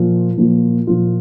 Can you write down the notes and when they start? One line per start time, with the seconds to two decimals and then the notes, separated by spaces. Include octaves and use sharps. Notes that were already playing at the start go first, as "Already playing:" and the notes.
Already playing: A#2 F3 A#3 F4
0.37 A#2 F3 A#3 F4
0.87 A#2 F3 A#3 F4